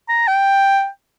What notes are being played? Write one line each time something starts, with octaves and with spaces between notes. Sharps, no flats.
A#5
G5